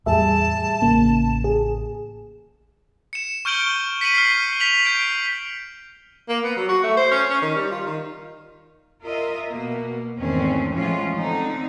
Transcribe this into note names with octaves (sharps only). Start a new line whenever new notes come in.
E2 A2 G3 G#4 E5 A5
A1 C#3 A#3 C#4
G#4
C#7 E7
C#6 F6 G6 D7 F#7 G7
B6 C#7 D#7 F#7
F6 C7
B6 F7 F#7
G6 D7
A#3
B3
F#3
F#4
A3
C5
C#4
C#4
D#3
G3
F4
D#3
F4 A#4 D#5 E5
B2 A#3
E2 G#2 D#3 A3 C4 C#4
A2 E3 F3 G#3 C#4 F4
D3 C4 D#4